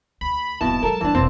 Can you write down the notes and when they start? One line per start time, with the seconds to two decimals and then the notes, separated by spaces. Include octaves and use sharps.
0.21 D2 B5
0.61 D#1 F2 G#2 B2 E4 A5
0.83 F#3 G#3 A4 A#4
1.01 F2 E3 G3 D4
1.15 E1 E3 C4